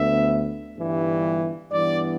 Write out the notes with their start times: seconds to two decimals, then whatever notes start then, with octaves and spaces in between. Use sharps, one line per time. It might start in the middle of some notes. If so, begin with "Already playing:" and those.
Already playing: D2 D3 B3 E5
0.76 G1 G2 E3
1.72 G2 E3 B3 D5